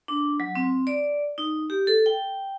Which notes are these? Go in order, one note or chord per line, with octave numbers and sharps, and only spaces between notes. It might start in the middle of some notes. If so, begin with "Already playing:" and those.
D4
F#3
C4
D5
D#4
G4
A4
G5